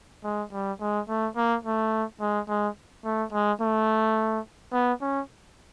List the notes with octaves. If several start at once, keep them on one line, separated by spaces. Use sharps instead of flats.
G#3
G3
G#3
A3
A#3
A3
G#3
G#3
A3
G#3
A3
B3
C#4